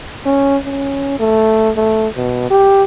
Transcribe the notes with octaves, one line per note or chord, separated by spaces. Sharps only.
C#4
C#4
A3
A3
B2
G4